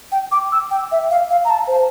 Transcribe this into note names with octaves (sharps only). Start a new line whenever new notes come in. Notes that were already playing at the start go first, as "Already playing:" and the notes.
G5
D6
E6
G5
E5
F5
F5
A#5
A5
C5